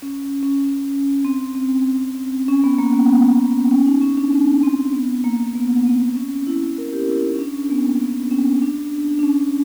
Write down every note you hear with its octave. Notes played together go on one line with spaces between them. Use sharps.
C#4
C#4
C#4
C4
C4
C#4
B3
A#3
B3
B3
C#4
D#4
C#4
D4
C#4
C4
B3
A#3
A#3
B3
C4
C#4
E4
A#4
G4
E4
D#4
C#4
D4
C#4
B3
A#3
B3
C#4
D4
D4
C#4